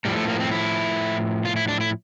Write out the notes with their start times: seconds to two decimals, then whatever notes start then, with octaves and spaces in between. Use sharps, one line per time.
0.05 A2 F3 G3
0.16 A3
0.28 A#3
0.40 C4
0.51 E4
1.45 F4
1.56 E4
1.68 D4
1.81 E4